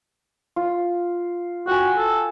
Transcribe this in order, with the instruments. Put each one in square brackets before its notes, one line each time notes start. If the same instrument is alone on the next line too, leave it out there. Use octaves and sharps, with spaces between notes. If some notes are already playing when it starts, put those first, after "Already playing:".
[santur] F4
[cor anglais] F#4 [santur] G5 G#5
[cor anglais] A4